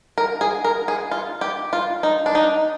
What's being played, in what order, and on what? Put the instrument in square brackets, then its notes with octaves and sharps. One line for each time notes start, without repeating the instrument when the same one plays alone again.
[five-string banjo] A#4
G#4
A#4
G#4
F4
G4
F4
D#4
D4
D#4